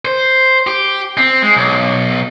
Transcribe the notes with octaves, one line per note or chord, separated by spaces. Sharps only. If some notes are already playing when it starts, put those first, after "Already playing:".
C5
G4
C4
G#3
B1